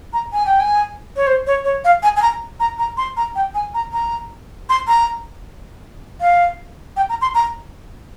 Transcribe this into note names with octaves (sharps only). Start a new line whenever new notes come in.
A#5
G#5
G5
G#5
C#5
C5
C#5
C#5
F5
G#5
G#5
A#5
A#5
A#5
C6
A#5
G5
G#5
A#5
A#5
C6
A#5
F5
G5
A#5
C6
A#5